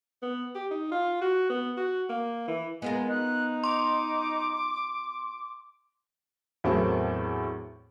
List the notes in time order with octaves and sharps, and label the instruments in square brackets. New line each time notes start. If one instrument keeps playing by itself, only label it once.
[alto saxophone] B3
G4
D#4
F4
F#4
B3
F#4
A#3
E3
[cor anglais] G#3 [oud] B3 F4 A#4
[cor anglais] D#4 [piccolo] F#6
[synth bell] C6 [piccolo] D6
[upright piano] E2 A2 F#3 C4 A#4 A5